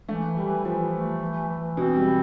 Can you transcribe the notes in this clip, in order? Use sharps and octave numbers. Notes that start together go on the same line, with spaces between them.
E3 A3
E3 G3
E3 F3
A3
E3
E3
B2 C4
G3
E3